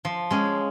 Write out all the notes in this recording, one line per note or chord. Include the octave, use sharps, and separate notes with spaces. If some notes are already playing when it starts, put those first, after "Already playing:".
F3
G#3 C#4